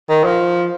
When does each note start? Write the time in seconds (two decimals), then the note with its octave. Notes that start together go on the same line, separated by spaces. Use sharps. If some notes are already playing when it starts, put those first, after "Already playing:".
0.09 D#3
0.24 F3